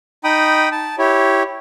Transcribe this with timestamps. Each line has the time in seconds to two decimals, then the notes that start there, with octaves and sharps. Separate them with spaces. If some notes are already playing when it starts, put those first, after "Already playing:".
0.24 D#4 G5 B5 D#6
0.72 A5
0.98 E4 G4 C#5